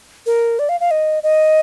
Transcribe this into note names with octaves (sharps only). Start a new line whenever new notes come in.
A#4
D5
F5
F5
D#5
D#5